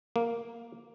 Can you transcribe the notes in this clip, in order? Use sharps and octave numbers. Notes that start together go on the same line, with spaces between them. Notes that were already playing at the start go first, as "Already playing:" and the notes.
A#3